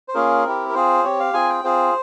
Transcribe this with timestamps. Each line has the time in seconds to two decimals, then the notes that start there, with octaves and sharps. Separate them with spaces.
0.08 C5
0.14 A#3 C#4 F4 G#4 A#4
0.45 C4 E4 G4
0.69 A#4
0.74 C4 F4 G#4 C5
1.04 C4 G4 C#5
1.20 F5
1.34 C4 F4 G#4 G#5
1.49 G5
1.64 C4 F4 G#4 C5